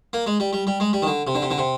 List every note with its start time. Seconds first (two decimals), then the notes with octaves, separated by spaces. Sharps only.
0.13 A#3
0.26 G#3
0.40 G3
0.53 G3
0.67 G3
0.80 G#3
0.93 G3
1.02 D#3
1.07 D3
1.27 C3
1.35 D3
1.42 C3
1.51 D3
1.58 C3